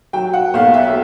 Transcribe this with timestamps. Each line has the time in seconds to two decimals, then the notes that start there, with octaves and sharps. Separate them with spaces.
0.13 F#3 G5
0.33 F#5
0.54 B1 F5
0.74 E5